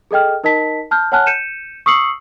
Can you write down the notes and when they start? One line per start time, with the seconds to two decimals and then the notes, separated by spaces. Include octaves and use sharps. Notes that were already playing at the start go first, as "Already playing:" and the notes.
0.11 G#4 A4 D#5 G5 F6
0.44 D#4 A#4 D#5 A5 B6
0.91 A5 F6 G6
1.12 C#5 F#5 G#5 A5 F6 F#6
1.27 G6 C#7 D#7 E7
1.86 C#6 D#6 E6 C7 C#7 F#7